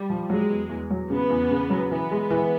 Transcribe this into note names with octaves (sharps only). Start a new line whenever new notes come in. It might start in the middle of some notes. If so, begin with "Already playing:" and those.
Already playing: G3
F3
F#3 G#3
E2
E2
F#3
C#3 B3
E2
C#3
F#3
E3 B3
G#3
E3